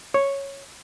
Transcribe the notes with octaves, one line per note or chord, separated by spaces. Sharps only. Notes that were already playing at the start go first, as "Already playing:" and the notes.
C#5